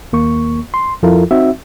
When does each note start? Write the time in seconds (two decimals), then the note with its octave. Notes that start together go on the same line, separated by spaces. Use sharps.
0.13 D#2 A#3 C#6
0.74 C6
1.03 F2 F3 E4 F4 A4 A#4
1.31 C4 D#4 F#4 E5